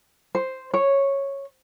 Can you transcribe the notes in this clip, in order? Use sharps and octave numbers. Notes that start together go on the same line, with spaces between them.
C5
C#5